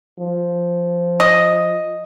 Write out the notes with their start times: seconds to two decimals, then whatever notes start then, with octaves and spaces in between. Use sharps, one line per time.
0.19 F3
1.20 D#5